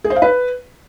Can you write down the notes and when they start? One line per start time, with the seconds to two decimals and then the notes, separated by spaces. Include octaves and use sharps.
0.04 G#4
0.10 C5
0.16 F5
0.22 B4